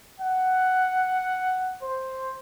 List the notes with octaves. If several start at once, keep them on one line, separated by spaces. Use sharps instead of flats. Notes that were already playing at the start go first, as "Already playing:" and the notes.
F#5
C5